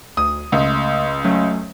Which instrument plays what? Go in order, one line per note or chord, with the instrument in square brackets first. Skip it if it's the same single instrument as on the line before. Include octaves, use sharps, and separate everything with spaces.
[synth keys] D2 [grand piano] D#6
[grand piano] C#2 [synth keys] A3
[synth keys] F#3 A3 C#4